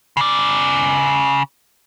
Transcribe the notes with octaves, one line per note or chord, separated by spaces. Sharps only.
C#3 D5